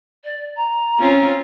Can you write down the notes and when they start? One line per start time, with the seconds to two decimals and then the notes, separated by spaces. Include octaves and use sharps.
0.24 D5
0.56 A#5
0.99 C4 C#4 F4